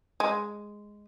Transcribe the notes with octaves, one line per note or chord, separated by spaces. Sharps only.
G#3